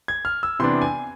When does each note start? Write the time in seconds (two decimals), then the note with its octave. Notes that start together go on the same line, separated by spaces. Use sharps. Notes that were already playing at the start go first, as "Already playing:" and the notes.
0.08 G#6
0.25 F6
0.43 E6
0.59 C3 E3 B3 D4 C6
0.82 G#5